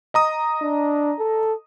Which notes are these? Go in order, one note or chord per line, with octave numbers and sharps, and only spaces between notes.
D#5 A#5 D#6
D4
A4